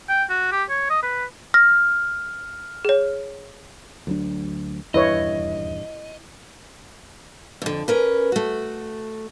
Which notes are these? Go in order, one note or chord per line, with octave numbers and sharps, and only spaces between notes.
G5
F#4
G4
C#5
D#5
B4
F6 A#6
G#4 C#5
D2 F#3 D4
D#1 E2 G2 E4 B4 C#5 D#5
F2 D3
C#4 A#4 B4
A3 F#4